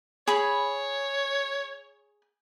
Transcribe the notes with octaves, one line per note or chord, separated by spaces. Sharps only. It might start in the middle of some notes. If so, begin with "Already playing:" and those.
G#4 C#5 B5